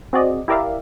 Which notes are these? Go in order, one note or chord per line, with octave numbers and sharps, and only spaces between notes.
C4 F#4 G#4 D5 D#5
E4 G4 A#4 D5 E5 F5